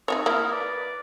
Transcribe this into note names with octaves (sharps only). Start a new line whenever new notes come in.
D#4 F#4 C#5 D#6
A#3 E4 A#4 D#6
B4 D5